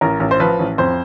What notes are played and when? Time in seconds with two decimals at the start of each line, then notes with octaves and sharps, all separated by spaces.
0.01 A1 A#4
0.20 A1
0.31 C5
0.40 F3 B4
0.59 A1
0.78 F2 C5